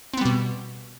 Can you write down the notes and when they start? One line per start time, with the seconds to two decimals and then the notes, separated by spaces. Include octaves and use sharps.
0.14 C4
0.17 B3
0.21 G3
0.25 B2